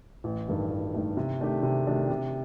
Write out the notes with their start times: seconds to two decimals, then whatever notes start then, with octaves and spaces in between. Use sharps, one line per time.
0.24 A1
0.48 G2 D#3 A3
0.70 A1
0.94 G2 D#3 A3
1.17 C3
1.39 D#3 A3 D4 G4
1.63 C3
1.86 D#3 A3 D4 G4
2.10 C3